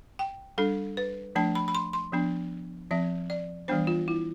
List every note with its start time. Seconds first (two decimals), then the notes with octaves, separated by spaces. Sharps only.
0.19 G5
0.58 G3 D4 A4
0.97 B4
1.35 F3 A3 D4 A5
1.55 B5
1.68 B5
1.75 C6
1.93 C6
2.13 F3 B3 D4
2.91 F3 C4 E5
3.30 D5
3.68 E3 G3 B3 D4 C5
3.87 F4
4.08 E4